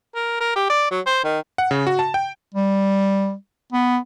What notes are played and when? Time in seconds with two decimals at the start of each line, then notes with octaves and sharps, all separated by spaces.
0.15 A#4
0.40 A#4
0.56 G4
0.70 D5
0.91 F#3
1.06 C5
1.24 D#3
1.58 F#5
1.71 C#3
1.87 F#4
1.99 A5
2.14 G5
2.54 G3
3.72 B3